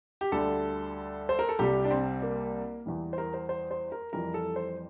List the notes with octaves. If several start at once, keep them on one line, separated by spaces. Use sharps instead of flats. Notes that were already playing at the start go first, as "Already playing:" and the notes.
G4
D2 D3 G3 A4
C5
A#4
A4
C2 C3 G3 G4
D4
C4
A#3
E2 E3 G3
C5
A#4
C5
C5
C5
A#4
F2 E3 G3 A#4
A4
C5